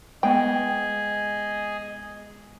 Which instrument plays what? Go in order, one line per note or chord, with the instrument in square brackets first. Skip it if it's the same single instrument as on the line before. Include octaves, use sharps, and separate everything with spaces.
[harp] G#3 B3 [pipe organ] G#4 [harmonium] D#5 [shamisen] G5